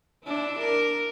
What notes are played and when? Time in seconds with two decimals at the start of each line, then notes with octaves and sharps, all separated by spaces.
0.25 D4 E4
0.59 A#4